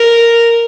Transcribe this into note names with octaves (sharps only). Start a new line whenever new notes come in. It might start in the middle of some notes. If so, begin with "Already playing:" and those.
Already playing: A#4